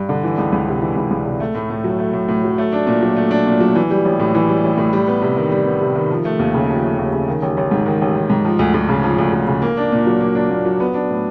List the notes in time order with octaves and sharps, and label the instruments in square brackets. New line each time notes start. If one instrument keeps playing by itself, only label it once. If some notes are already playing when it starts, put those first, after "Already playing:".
Already playing: [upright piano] G2
D3
E3
C#2
C#2
C3
E3
C#2
C#2
C3
A3
A2
A2
F#3
A3
A2
A2
F#3
A3
D4
A#2
F#3
A3
D4
A#2
F#3
E3
G3
A1
A2
E3
G3
A1
A2
G3
B3
C3
D#3
G3
B3
C3
D#3
F3
A3
D#2
C#3
F3
A3
D#2
C#3
D#3
A1
A1
G#2
D#3
A1
A1
G#2
F3
D2
D2
C#3
F3
D2
D2
C#3
A#3
D4
A#2
F#3
A#3
D4
A#2
F#3
B3
D4
A2